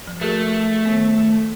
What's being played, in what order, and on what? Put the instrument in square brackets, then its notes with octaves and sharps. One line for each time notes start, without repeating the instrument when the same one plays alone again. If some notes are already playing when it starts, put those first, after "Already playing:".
[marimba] F3
[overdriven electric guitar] A3 [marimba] F#4 G#4 A#4
[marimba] D#3 B3